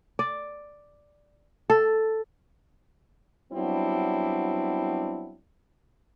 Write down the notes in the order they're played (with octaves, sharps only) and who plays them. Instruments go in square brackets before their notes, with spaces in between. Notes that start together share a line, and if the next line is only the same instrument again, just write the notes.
[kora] D5
A4
[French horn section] F#3 G3 B3 C4 D4 E4